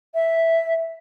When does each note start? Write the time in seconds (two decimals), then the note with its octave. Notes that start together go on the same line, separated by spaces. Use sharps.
0.15 E5